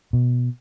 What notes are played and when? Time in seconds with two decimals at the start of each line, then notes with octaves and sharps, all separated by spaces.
0.13 B2